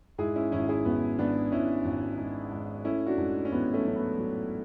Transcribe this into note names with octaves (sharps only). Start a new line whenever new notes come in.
G#2 E4 G#4
C#4 E4
G#1 C#4 E4
E4 G#4
G#1 B3
G#1 B3 D4
G#2 C#4 E4
G#1
G#2
G#2
A3 C#4 E4
D4 F#4
G#2
C#4
A1 B3
A3 C#4
F#3 C#4
B3
F#3